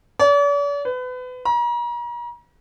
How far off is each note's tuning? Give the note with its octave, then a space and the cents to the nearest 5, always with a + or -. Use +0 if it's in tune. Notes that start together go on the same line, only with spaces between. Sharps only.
D5 -45
B4 +30
A#5 +40